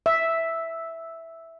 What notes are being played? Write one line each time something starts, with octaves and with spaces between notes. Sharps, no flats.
E5